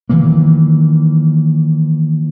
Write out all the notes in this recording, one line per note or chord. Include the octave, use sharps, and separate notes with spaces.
D#3 E3 F#3 A#3